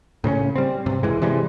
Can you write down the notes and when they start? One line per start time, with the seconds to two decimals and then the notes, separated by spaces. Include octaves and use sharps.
0.24 A2 C#3 C4 C#4
0.56 G3 C4
0.86 G2 C3
1.03 E1 E3 G#3
1.22 C3 E3 G3 G#3